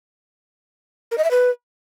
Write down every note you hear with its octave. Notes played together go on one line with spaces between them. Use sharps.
A#4
D#5
E5
B4